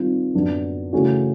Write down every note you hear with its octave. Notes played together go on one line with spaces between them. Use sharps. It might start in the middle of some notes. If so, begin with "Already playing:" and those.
Already playing: D#3 G3 C4 F4
F#2 D3 F#3 B3 D4
C#3 E3 A3 C#4 F#4